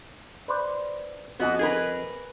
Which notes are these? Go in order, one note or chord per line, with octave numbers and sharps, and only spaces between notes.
B4 C5 D5
F2 B3 F#4 D#5 G#5
G#4 A#4 B4